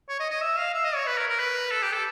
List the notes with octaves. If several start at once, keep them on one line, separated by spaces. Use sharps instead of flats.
C#5
D#5
D#5
E5
F5
E5
D#5
C#5
B4
A#4
A#4
B4
A4
G4
A4